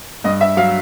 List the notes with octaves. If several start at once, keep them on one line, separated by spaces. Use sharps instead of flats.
G2 D#5
E5
F#3 F5